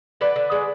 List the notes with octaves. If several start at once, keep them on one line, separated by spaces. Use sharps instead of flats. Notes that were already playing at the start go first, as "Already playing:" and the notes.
D3 B4 D5
D3
G#3